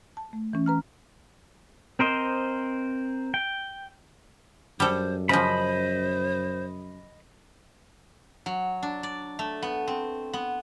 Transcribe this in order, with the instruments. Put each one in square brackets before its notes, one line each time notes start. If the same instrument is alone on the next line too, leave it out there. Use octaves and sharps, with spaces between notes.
[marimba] A5
A3
E3 C#4
B4 A#5 F6
[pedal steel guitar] C4 A#4 C5 D#5
G5
[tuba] F#2 [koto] G3 A4 [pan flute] C5
[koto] C#3 F3 [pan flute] C5 [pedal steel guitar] D#5 B5
[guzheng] F#3
D4
D5
A3
B3
C4
B3